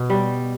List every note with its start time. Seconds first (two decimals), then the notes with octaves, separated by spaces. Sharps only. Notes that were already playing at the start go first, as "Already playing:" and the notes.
Already playing: B2
0.10 G3